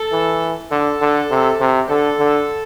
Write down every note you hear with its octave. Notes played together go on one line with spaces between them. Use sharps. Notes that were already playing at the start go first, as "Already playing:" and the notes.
Already playing: A4
E3
D3 A4
D3
C3
C3
G4
D3 A4
D3